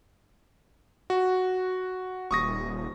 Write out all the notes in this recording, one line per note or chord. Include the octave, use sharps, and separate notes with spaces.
F#4
D#1 C#6 D#6 A#6